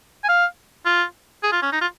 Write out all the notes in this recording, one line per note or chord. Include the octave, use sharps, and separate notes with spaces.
G#5
F5
F4
G#4
F4
C#4
D#4
F4